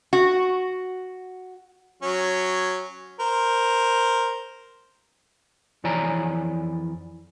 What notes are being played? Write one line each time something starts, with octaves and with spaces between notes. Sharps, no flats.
F#4
F#3 C#4
A#4 C5
F2 E3 C#5 D5 G#5 A#5